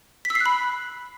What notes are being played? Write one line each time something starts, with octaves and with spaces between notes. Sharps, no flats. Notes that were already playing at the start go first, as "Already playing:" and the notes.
B6
E6
C7
F#6
B5